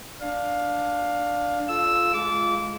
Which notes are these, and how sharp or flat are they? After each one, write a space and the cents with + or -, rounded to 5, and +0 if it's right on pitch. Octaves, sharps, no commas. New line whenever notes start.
D4 +0 F5 +15
F4 +0 A4 -20 E6 +0
G#3 +20 F4 +0 D6 -25